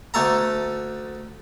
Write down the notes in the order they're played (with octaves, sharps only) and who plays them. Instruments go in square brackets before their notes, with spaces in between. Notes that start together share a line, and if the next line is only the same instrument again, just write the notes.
[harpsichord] D2 A3 A4 A#5